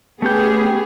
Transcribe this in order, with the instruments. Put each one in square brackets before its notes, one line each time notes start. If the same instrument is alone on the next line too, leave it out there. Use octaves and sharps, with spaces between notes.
[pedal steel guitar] A3 C#4 G6 [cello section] B3 G#4 [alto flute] G4